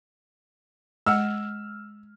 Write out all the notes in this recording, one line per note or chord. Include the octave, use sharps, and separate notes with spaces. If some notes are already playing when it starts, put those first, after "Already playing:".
G#3 F#5 E6 F6